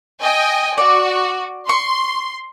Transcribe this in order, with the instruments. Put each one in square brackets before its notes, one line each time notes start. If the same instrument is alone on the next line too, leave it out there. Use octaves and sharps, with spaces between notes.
[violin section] D#5 G5 G#5
[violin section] F#4 [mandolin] D5
[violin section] C6 [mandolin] C#6